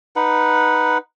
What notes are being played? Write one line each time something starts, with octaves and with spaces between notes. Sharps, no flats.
D#4 B4 F#5